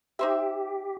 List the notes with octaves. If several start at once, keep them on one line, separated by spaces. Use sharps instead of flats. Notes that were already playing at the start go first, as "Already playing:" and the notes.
D#4 G4 C5 E5